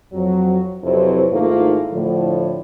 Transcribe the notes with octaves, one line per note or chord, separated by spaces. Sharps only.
F2 F#3
F2 C3 F#3 E4 B4 C5
G#2 D#3 A3 A#3 E4 F4
A2 D3 F3